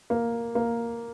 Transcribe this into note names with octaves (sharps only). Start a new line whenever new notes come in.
A#3
A#3